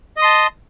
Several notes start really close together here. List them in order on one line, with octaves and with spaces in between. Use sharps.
D#5 D#6 C6 A5